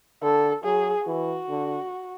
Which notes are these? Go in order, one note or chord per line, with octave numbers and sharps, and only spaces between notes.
D3 A4
F#3 G#4
E3 F#4
D3